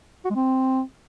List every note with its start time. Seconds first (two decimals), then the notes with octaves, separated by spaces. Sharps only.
0.25 F#4
0.30 G#3
0.35 C4